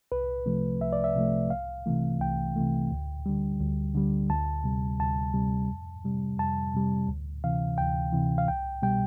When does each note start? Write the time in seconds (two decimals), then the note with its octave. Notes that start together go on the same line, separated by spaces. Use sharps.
0.12 C2 B4
0.46 C3 F3 A3
0.81 C2 E5
0.93 D5
1.04 E5
1.15 C3 F3 A3
1.50 C2 F5
1.86 C3 E3 A3
2.20 C2 G5
2.56 C3 E3 A3
2.91 D2
3.26 D3 G3
3.60 D2
3.95 D3 G3
4.30 D2 A5
4.64 C3 G3
4.99 D2 A5
5.34 C3 G3
5.70 F2
6.04 C3 G3
6.38 F2 A5
6.74 C3 G3
7.08 D2
7.44 C3 E3 F5
7.78 D2 G5
8.12 C3 E3
8.38 F5
8.48 C2 G5
8.82 B2 G3 G5